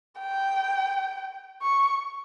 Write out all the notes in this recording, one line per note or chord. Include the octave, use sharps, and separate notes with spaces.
G5
C#6